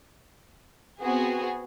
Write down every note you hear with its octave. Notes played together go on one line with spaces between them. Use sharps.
B3 C4 F#4 G#4